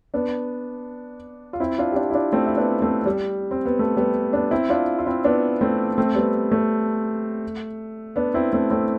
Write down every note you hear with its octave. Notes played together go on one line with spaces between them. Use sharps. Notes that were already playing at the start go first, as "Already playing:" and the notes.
B3 D4
F4
C4 E4
D4 F4
G4
D4 F4
E4
D4 F4
A3 C4
E4
B3 D4
A3 C4
G3
C4
B3
A3
G3 B3
B3 D4
C4 E4
D4 F4
F4
C4 E4
B3 D4
A3 C4
A3 C4
G3 B3
A3
B3 D4
C4 E4
A3 C4
A3 C4